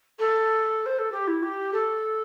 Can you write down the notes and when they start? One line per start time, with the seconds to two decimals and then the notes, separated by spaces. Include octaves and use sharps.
0.19 A4
0.86 C5
0.99 A4
1.12 G4
1.28 E4
1.43 G4
1.73 A4